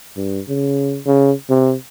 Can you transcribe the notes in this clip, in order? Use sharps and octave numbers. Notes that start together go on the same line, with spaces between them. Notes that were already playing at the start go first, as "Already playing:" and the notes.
G2
C#3
C#3
C3